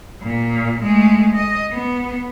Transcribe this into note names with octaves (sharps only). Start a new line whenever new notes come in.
A#2
G#3 A3
D#5
B3